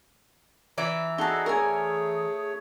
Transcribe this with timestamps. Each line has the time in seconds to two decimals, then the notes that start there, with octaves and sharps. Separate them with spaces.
0.78 E3 D5 E5 A#5
1.18 D#4 F#4 G#4 A4 A5
1.46 A3 G#4 A#4 C#5 G#5